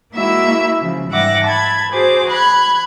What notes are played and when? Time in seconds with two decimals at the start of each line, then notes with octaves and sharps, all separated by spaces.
0.14 G#3 A#3 E4 F#4 E5 E6
0.81 C#3 F3
1.09 G#2 G3 E5 F#5 D6 A#6
1.43 A5 B5 G#6
1.90 F#4 G#4 C5 D6
2.28 B5 F#6 G#6